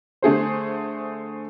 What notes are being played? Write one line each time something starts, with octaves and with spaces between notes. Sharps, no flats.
D3 A3 G#4 C5